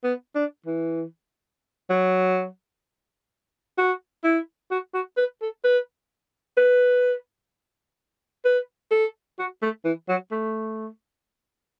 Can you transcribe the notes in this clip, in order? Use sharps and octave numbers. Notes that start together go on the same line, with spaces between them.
B3
D4
E3
F#3
F#4
E4
F#4
F#4
B4
A4
B4
B4
B4
A4
F#4
A3
E3
F#3
A3